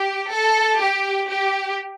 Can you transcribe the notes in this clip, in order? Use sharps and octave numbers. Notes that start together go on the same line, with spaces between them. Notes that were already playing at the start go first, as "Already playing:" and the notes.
Already playing: G4
A4
G4
G4